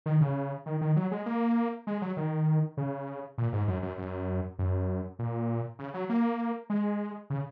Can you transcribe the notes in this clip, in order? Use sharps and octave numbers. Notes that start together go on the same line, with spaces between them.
D#3
C#3
D#3
D#3
F#3
G#3
A#3
G#3
F#3
D#3
C#3
A#2
G#2
F#2
F#2
F#2
F#2
A#2
C#3
F#3
A#3
G#3
C#3